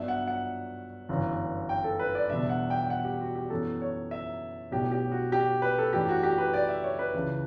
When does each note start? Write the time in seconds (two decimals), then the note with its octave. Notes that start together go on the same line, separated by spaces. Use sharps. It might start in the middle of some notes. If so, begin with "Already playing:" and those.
Already playing: G2 F#3 B3 D4 E5
0.08 F#5
0.27 F#5
1.09 G1 F#2 E3
1.69 G5
1.84 A4
1.99 B4
2.15 D5
2.30 E2 B2 G3 D4 E5
2.49 F#5
2.70 G5
2.83 G5
2.90 F#5
3.05 G4
3.21 F#4
3.35 G4
3.50 F#2 E3 B3 A4
3.82 C#5
4.11 E5
4.71 B1 A2 F#3 B3 D4 G4
4.92 G4
5.12 F#4
5.32 G4
5.62 B4
5.78 A4
5.93 F#2 E3 A3 D4 G4
6.09 F#4
6.23 G4
6.38 B4
6.54 D5
6.69 E5
6.84 C#5
6.99 B4
7.14 C#2 C#3 E3